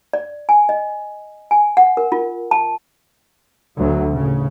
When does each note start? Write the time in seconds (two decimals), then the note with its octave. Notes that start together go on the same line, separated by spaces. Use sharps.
0.13 D5
0.49 G#5
0.69 D#5
1.51 G#5
1.77 F#5
1.97 A#4
2.12 F4
2.51 A5
3.77 D2 F#3
4.13 A1 C#3